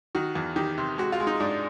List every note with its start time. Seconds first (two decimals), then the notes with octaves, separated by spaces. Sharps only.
0.15 D#3 F#4
0.35 E2
0.56 D#3 G4
0.78 C3
0.98 G#3 F#4
1.12 F4
1.20 G#3
1.27 D#4
1.40 G#2 D4